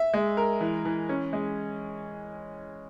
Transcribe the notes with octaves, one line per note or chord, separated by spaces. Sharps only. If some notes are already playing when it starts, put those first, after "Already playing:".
Already playing: E5
G#3
A#4
E3
E3
C#4
G#3